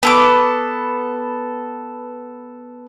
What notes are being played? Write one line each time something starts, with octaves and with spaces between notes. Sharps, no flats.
B3 A4 D6